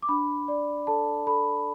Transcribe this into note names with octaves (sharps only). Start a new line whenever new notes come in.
D6
D4 B5
D5
A4 A5
A4 B5